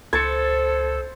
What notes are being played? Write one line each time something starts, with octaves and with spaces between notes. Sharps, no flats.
C#2 A4 C5 G#6 A6 C#7